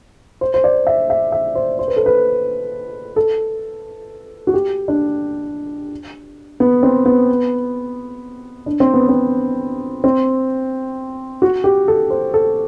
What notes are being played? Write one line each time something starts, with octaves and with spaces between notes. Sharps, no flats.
C5
C5
D5
E5
E5
E5
C5
C5
B4
A4
B4
A4
F#4
G4
D4
B3
C4
B3
D4
C4
B3
C4
C4
F#4
G4
A4
C5
A4